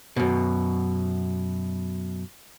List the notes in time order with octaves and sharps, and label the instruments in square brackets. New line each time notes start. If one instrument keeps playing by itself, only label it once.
[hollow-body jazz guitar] F#2 B2